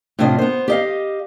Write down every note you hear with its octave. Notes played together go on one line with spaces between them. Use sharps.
A2 C3 D4 F4 D#5
B3 C5
G4 D#5 F5